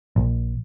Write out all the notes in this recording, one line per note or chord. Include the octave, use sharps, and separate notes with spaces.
A#1